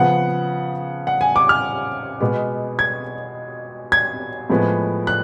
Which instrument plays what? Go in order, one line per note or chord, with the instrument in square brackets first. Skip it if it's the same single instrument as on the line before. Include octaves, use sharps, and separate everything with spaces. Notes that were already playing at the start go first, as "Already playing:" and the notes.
Already playing: [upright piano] C#3 F3 B3 F#5
F#5
G#5
D6
F6
B2 G#3 B3
G#6
G#6
A2 F3 G#3 B3
F#6